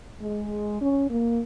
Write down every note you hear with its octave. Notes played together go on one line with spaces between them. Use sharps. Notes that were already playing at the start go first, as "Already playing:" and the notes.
G#3
C#4
A#3